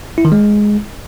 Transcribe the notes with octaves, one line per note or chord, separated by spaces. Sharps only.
E4
D#3
G#3